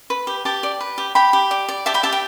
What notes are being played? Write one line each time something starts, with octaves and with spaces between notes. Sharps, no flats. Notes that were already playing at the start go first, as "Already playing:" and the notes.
B4
G4
G4 A5 D6
D5
B4
G4
G4 G5 B5
G4
D5
D5
G4 E5 A5
G5 B5
G4 E5 A5
G5